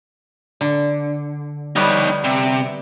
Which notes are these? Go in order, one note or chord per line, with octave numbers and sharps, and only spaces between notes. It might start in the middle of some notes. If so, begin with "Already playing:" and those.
D3
G3 B3 D#4 C#5
C3